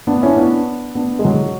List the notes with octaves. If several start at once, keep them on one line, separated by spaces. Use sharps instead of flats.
B3 D4
C#4 E4
B3 D4
B3 D4
G#3
F#3